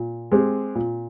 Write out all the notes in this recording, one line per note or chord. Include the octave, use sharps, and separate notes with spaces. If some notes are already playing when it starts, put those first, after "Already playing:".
Already playing: A#2
G#3 C4 G4
A#2